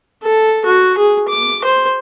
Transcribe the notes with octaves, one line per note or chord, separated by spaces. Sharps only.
A4
F#4
G#4
D6
C5